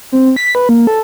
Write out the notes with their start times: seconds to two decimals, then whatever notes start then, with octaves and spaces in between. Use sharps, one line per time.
0.12 C4
0.36 B6
0.55 B4
0.69 A#3
0.87 A4